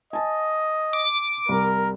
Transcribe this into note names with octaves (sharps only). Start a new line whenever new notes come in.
D#5 G#5 A5
D6
C2 A#4